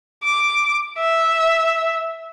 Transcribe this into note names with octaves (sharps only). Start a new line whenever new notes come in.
D6
E5